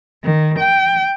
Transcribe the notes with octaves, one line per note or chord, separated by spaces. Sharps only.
D#3
G5